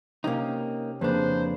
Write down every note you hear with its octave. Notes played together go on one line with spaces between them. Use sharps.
C3 A#3 C#4 D#4
F2 C#3 A#3 D4 B4 C5